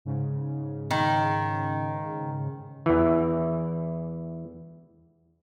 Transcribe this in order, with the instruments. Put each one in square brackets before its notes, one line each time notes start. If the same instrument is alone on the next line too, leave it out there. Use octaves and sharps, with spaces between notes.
[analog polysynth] G#2 C#3
[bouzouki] D#3
[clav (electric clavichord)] E2 E3